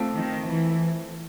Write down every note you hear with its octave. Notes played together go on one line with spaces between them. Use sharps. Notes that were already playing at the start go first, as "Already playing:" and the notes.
Already playing: A3 C4 F4 A4
D#3
E3